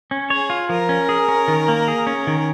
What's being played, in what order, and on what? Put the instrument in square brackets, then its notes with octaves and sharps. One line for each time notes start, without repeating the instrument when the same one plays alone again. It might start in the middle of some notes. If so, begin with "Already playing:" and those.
[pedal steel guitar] C#4
[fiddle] G#4 [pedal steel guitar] C#5
[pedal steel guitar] F4
[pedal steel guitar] F3 [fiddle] A#4
[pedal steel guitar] C#4
G#4
C#4
D#3
A#3
G#4
C#4
D#3